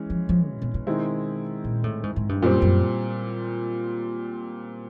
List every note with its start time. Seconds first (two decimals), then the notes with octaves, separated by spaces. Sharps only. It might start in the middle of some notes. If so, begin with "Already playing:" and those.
Already playing: E3 G#3 C#4
0.10 F3
0.29 F3
0.49 B2
0.62 B2
0.74 B2
0.87 D#3 G#3 C4 E4
1.64 A#2
1.84 A2
2.03 G#2
2.16 G#2
2.29 G2
2.42 F#2 A#2 G3 C4
2.62 F#2